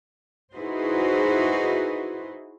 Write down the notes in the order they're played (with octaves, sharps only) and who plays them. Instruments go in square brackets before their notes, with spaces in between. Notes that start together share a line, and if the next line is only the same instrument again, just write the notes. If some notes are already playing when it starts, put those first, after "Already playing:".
[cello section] D#4 E4 F#4 G#4 B4 C5